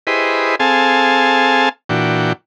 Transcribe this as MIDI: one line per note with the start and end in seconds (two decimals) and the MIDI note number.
0.07 0.55 64
0.07 0.55 67
0.07 0.55 68
0.07 0.55 71
0.07 0.55 72
0.07 0.55 75
0.60 1.69 60
0.60 1.69 68
0.60 1.69 69
0.60 1.69 77
0.60 1.69 80
0.60 1.69 81
1.89 2.33 46
1.89 2.33 52
1.89 2.33 62
1.89 2.33 66
1.89 2.33 79